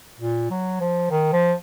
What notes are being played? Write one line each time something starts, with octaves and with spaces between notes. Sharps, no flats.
A#2
F#3
F3
D#3
F3